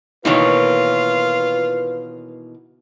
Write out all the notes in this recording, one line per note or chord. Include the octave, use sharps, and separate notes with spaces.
B2 D#3 E3 A#3 F4 B4 C#5